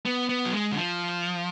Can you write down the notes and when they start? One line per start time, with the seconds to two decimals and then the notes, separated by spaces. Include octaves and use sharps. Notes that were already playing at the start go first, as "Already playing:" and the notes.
0.06 B3
0.29 B3
0.46 F#3
0.53 G#3
0.72 D3
0.77 F3